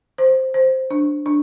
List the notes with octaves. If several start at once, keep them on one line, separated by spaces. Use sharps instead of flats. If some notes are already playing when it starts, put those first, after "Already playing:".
C5
C5
D4
D4